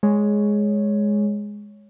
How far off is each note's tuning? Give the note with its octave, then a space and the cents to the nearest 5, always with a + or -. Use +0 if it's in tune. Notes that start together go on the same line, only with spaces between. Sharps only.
G#3 +0 C#5 +5